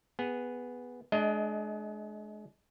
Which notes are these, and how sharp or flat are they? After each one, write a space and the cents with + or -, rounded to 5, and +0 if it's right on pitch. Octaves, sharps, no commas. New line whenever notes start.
B3 +0 G#4 -15
G#3 +35 D4 +10 D#5 +20